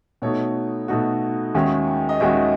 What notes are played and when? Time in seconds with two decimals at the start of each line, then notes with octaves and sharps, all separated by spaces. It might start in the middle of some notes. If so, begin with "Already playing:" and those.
0.22 B2 A3 D#4 F#4 C#5
0.88 B2 A3 D#4 F#4
1.54 D#2 D#3 G#3 C#4 F#4 E5
2.09 D#5
2.20 D#2 D#3 G#3 C#4 F#4 E5